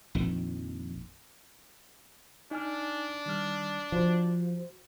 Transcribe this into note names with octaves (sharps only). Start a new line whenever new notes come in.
A#1 F2 D#3
D4 D#4 G#5 F6
D#3 G3 F6
F3 F#4 C5